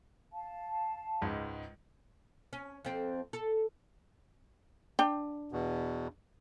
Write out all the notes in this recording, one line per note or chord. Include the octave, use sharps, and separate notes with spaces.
F5 A5
C#2 G#2
C#4
F2 C4
A4
D4 G5
E2 B2